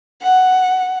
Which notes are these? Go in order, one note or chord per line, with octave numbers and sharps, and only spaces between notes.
F#5